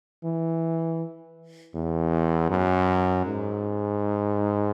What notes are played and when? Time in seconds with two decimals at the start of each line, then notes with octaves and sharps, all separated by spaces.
0.24 E3
1.75 E2
2.50 F#2
3.26 G#2